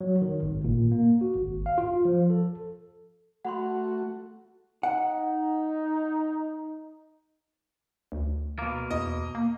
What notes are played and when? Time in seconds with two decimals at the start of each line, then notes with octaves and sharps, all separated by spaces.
0.01 F#3
0.22 D#3
0.43 G#1
0.64 A#2
0.92 A#3
1.21 F#4
1.36 G#1
1.66 F5
1.78 F4
2.05 F3
2.30 A4
3.45 A3 F#4 F#5 B5 C6
4.83 D#4 F#5
8.12 D2
8.59 B2 A#3
8.90 E2 D#5
9.35 A#3